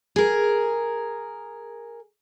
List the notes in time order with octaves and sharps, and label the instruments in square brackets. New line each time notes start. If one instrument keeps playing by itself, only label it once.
[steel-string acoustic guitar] G#4 A#4